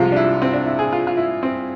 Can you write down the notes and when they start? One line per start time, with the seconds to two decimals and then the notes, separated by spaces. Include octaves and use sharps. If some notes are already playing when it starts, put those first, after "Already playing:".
Already playing: C2 C3 F3 G#3 F4
0.12 D4
0.16 E4
0.42 C4
0.53 D4
0.66 E4
0.79 G#4
0.93 F4
1.07 F4
1.17 E4
1.43 C4